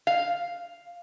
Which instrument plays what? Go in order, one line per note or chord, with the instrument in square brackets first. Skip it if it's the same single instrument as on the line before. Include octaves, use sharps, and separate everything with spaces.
[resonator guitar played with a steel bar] F5